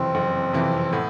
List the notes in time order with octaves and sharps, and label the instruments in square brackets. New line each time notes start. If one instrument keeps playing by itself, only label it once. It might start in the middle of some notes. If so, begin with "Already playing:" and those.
Already playing: [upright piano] F#1 F2 C3 E3 [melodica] C4
[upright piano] F#1
F2 C3 E3
[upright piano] A2 [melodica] B3